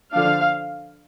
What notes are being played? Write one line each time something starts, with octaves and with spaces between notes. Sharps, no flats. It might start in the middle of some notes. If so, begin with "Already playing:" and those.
D3 F3 D4 F5